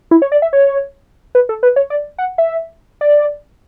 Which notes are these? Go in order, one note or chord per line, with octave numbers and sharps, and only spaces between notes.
E4
C#5
D5
E5
C#5
B4
A4
B4
C#5
D5
F#5
E5
D5